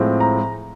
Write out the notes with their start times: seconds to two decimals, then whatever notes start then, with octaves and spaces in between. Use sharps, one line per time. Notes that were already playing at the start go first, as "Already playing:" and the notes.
Already playing: A2 F3 G#3 C4
0.20 A#5